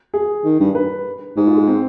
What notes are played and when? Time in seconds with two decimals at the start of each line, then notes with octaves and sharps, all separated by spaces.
0.14 G#4
0.45 D#3
0.60 G2
0.75 B4
1.37 G#2 G#4
1.47 F4
1.57 G#3
1.67 C4